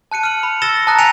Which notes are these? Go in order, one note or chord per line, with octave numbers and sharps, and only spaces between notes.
A5 F#6 C#7 D#7
F6 C#7 D#7 F#7
B5
E6 A6 A#6 C#7 E7 G7
A5 A#5 D#6 F#6 A#6
G#5 A#6 B6 C#7 D#7 F7